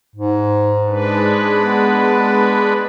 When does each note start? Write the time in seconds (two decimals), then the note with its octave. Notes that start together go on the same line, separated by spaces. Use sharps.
0.16 G#2
0.88 G#3 D4 B4
1.59 B3